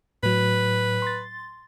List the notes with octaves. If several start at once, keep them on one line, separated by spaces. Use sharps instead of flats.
A2 F#3 B4
C6 A6